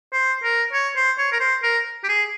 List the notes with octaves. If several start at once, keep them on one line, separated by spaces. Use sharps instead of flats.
C5
A#4
C#5
C5
C#5
A#4
C5
A#4
G4
G#4